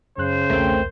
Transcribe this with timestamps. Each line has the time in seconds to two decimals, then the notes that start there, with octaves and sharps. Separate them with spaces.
0.18 F#2 C#3 C5 F#6
0.50 B1 E2 A3 C4 A#4